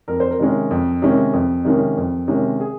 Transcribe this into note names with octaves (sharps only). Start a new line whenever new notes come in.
F2 A#4
C5
A#4
C3 D#3 G#3 C#4
F2
C3 D#3 G#3 C#4
F2
C3 D#3 G#3 C#4
F2
C3 D#3 G#3 C#4
G#4